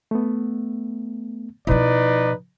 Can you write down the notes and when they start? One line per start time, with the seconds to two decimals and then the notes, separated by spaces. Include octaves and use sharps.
0.11 A3 B3
1.67 B2 F3 D#4 E4 B4 D5